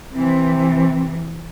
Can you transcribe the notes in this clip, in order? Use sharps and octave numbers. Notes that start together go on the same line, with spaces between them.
C3 E3 C4